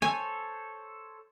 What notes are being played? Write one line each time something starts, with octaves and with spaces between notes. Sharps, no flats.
A4 C5 C#5 G#5